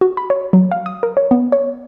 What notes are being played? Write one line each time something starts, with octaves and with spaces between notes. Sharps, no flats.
F#4
B5
C#5
F#3
F5
D#6
A#4
C#5
B3
C#5